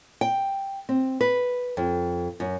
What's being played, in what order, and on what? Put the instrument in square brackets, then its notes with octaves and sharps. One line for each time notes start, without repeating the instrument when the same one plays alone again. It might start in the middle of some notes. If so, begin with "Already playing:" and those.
[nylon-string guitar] G5
C4
B4
F2
F#2